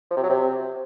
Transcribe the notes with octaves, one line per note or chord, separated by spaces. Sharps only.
F3
C3
F#3
C3